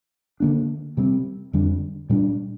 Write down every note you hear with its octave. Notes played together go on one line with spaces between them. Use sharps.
D3 A#3 D4
C3 G3 C4
F2 D3 G3 D4
A#2 G3 D4